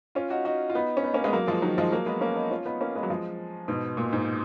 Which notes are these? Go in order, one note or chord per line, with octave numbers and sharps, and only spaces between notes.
C#4 F4
D#4 F#4
D#4 F#4
F4
B3 D#4
C#4
B3 D#4
A#3 C#4
G#3 B3
F#3 A#3
F3 G#3
D#3 F#3
F3 G#3
F#3 A#3
G#3 B3
A#3 C#4
B3 D#4
C#4 F4
B3 D#4
A#3 C#4
G#3 B3
F#3
F3 G#3
G#2 B2
A#2
G#2